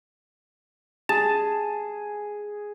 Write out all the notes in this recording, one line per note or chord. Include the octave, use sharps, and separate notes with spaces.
G#4 A5